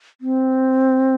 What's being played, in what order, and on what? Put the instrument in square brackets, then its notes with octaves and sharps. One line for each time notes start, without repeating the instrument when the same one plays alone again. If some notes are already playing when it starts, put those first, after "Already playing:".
[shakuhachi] C4